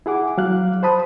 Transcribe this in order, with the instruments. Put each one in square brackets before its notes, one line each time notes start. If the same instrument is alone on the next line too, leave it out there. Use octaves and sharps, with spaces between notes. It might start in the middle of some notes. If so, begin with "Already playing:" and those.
[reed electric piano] E4 G#4 F#5 D6
F#3 F5 F#6
C5 A5 B5 D#6